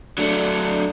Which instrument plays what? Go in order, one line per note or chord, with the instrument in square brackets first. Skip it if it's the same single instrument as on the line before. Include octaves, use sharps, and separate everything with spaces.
[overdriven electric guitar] F#3 A3 [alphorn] D4